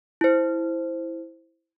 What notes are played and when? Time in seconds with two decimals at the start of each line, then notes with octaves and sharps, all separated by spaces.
0.21 E4 C5